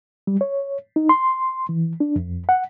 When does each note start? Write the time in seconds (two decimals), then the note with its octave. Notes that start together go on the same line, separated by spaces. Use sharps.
0.27 G3
0.41 C#5
0.96 D#4
1.09 C6
1.69 E3
2.00 D4
2.16 F2
2.49 F#5